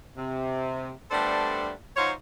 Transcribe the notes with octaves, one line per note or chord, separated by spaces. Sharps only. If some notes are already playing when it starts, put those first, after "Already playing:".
C3
G3 A3 B3 D4 A4 C5
F#3 D#4 F4 C5 C#5